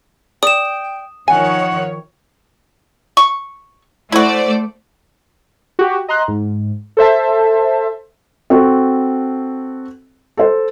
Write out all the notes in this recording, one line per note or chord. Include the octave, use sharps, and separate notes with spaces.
D5 G5 D#6 E7
D#3 F3 C#5 F#5 G#5
C#6
A3 E4 F#4 C5 D5
F#4 G4
D#5 A#5 C6 F#6
G#2
A4 C5 E5 A5
C4 F#4 A4
A4 C5